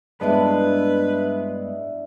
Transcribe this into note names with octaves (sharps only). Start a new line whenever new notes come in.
G2 G#3 B3 D4 E4 B4